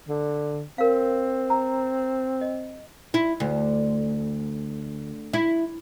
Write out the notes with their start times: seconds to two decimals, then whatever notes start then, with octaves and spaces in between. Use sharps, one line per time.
0.09 D3
0.78 C4 A#4 F5
1.50 A#5
2.41 D#5
3.14 E4
3.40 D2
5.33 E4